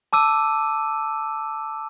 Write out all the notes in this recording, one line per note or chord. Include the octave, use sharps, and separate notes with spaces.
A5 D6 E6 D#7